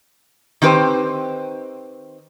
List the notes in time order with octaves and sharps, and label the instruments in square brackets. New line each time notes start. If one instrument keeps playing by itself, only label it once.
[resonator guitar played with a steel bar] D#3 C4 G4 B4 C5